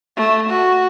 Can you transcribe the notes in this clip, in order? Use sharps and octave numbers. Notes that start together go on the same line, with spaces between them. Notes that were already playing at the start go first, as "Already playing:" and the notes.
A3
F#4